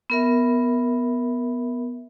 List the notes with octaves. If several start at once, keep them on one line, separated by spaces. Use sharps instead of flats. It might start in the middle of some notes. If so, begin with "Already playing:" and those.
B3 A#4 E5